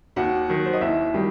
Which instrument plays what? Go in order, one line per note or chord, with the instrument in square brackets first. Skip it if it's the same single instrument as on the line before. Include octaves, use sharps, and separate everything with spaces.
[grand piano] D#2 [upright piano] F#4 F#5
[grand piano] D#3 F#3
[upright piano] C5
D#5
[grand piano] D#2 [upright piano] E4 E5
[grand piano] D#3 F#3 [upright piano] G3 G4